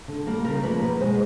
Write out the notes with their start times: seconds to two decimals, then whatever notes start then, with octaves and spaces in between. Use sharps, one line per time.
0.08 D3
0.27 G3 A#3
0.44 C#3 A#4
0.63 F3 A#3 B4
0.82 B2 B4
1.01 G#3 C5